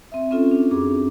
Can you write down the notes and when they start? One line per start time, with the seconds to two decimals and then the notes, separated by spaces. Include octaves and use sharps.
0.12 C4 E5
0.31 C4 C#4 F4 A4
0.51 D4
0.71 F#2 C4 G#4 D6